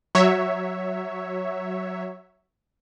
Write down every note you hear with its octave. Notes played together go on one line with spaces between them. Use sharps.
F#3 C#5 E5